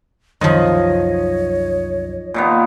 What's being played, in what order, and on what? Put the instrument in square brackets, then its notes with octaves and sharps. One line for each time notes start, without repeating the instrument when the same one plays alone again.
[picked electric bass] C2 F#2 [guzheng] D#3 F3 [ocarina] C#5 [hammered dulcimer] D#5
[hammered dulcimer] A#2 D#3 B3